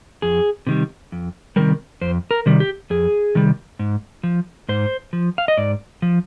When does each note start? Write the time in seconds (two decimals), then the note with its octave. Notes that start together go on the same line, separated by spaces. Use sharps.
0.22 F2 G#4
0.67 C3 D#3 G3
1.12 F2
1.56 C3 D#3 G3 A#4
2.01 F2 C5
2.31 A#4
2.46 C3 D#3 G3
2.60 G4
2.90 F2 G#4
3.35 C3 D#3 G3
3.79 G#2
4.23 F3
4.69 G#2 C5
5.13 F3
5.38 F5
5.48 D#5
5.57 G#2 D5
6.02 F3